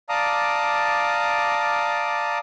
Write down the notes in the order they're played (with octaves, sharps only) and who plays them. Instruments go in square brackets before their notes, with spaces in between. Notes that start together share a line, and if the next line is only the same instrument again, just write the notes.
[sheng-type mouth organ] D5 F5 A5 A#5 D6 D#6